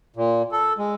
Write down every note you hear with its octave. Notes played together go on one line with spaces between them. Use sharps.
A#2
A4
G#3